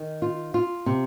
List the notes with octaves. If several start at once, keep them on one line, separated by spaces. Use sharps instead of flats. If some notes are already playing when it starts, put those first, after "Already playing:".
Already playing: D#3
F4
F4
C3